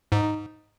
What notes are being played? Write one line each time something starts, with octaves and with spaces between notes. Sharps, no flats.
G#2 D#4